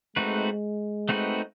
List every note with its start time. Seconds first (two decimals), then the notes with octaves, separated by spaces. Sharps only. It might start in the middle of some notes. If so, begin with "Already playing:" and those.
0.16 G#3 A3 C4 D#4 F#4 B4
1.09 A3 C4 D#4 F#4 B4